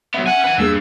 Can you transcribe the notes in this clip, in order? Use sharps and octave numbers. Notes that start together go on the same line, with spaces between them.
F#3 B3 E5
C#4 F#5 G#5
B4 G#5
E2 G2 A#3 G#4 E6